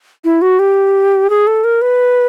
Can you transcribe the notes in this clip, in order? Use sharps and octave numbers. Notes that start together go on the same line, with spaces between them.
E4
F#4
G4
G#4
A4
A#4
B4